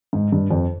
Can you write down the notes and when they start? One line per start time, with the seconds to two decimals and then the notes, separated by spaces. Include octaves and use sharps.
0.13 G#2
0.32 G2
0.51 F2